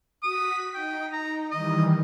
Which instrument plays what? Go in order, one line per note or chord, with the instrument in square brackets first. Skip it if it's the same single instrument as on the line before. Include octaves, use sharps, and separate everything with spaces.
[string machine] F#4 B6 [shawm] D#6
[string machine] D#4 [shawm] G5
[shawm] A#5
[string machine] D#3 E3 G3 [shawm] D#5